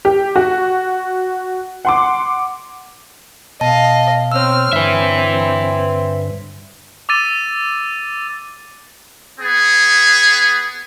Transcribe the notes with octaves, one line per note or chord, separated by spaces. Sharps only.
G4
F#4
F#5 C6 D6
B2 D#5 F5 A5
C4 C#5 E6 F6
G2 D3 C4 B4 E5
D6 E6 A6 D#7
B3 G#4